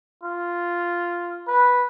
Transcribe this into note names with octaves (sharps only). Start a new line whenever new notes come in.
F4
B4